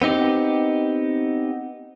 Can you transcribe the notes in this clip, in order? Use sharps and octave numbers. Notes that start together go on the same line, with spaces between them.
B3 C4 D#4 G4